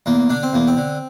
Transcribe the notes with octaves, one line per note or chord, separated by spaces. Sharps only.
E2 A#3
D3 D4
C4
E2 A#3
C4
D3